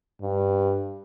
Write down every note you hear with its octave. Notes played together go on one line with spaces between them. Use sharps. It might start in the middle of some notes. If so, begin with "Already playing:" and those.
G2